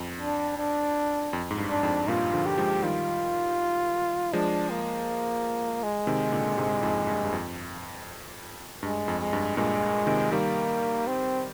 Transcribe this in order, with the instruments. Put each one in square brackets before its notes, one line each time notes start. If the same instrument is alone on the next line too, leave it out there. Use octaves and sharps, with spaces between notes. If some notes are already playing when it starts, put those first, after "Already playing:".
Already playing: [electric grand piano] F2
[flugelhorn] D4
D4
[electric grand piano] F2
G#2
G2
[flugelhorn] D4
[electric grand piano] F2 G#2
[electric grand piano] G2 A#2 [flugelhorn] F4
[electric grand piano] D3 F3
[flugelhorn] G4
[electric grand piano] F3 G#3
[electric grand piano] D#3 G3 [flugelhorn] F4
[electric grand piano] F3 G#3 [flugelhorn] D4
[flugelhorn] A#3
G#3
[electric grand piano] C3 D#3
A#2 D3
G#2 C3
F2 G#2
G2
G2
F2
[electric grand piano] G2 [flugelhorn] G#3
[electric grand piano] F2
[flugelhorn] G#3
[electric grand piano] G2
[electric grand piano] G2 A#2 [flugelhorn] G#3
[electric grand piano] C3 D#3
[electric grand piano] D#3 G3 [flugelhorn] A#3
[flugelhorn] C4